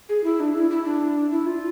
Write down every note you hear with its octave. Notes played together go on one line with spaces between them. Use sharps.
G#4
E4
D4
E4
E4
D4
E4
F4